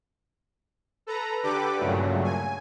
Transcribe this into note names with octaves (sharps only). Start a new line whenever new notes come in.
A4 B4 A#5
D3 G4 A4 B4 D6
G2 A#2 C#3 F#3 A3
G#5